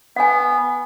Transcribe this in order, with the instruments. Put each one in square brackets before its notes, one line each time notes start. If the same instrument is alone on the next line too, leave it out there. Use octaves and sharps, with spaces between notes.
[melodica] B3 [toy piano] F#5 G#5